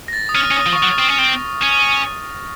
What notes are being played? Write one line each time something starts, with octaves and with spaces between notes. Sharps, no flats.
A#6
A6
D#6
C#4 F6
C#4
D#6
F3
C#6
D#6
F#3
C4 D#6
C#4
C4
C#4